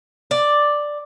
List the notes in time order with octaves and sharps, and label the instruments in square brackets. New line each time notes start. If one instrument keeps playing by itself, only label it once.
[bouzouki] D5